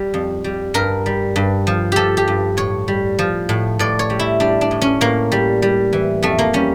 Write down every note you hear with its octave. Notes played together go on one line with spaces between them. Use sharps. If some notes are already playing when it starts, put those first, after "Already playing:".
Already playing: G3
F2
G3
G2 A#4
G3
G2
F3
F3 G4 A4
G4
G2
A2 C#5
G3
F3
A2
A2 D5
C#5
G3
E4
G3 D4
D4
A2
C#4
A2 A#3
G3
G3
E3
F2 A3
A#3
G3 C#4